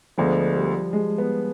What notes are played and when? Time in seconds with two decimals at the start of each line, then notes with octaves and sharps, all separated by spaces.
0.18 D2 D3 F3 G#3 B3 D4
0.56 G3
0.93 G#3
1.18 B3